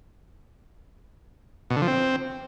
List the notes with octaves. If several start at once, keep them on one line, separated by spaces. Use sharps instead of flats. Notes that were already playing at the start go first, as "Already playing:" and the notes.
B2
D3
F3
C4